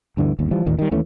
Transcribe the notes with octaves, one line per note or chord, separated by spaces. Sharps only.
D2 G2 D3 E3
G1 D#2
E3 F3 G3
A1 D#2 A#2 D#3
D#3 G3
D#2 E3 A3 C#4